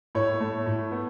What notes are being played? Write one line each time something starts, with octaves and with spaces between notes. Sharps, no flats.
A2 C#5
A3
A2
B3